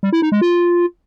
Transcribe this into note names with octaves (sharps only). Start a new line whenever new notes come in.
G3
E4
D#4
G#3
F4